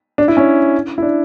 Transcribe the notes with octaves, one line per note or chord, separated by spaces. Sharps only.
D4
E4
C#4
E4
D4